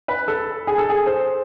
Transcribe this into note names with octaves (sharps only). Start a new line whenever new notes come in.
B4
A4
G#4
A4
G#4
C5